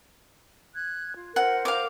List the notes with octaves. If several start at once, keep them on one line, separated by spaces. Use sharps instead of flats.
F#6 G#6
F4
F4 A#4 C5 F#5
F5 D6